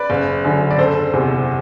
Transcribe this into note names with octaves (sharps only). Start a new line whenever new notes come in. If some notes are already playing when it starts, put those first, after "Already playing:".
Already playing: B4 D5
F#1
F#2 D3 F#3
D5
F#1 A4 C5
E2 C3